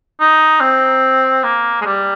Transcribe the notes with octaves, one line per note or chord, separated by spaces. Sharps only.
D#4
C4
A#3
G#3
G3